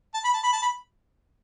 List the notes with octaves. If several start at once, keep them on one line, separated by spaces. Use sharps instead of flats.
A5
B5
A5
B5
A5
B5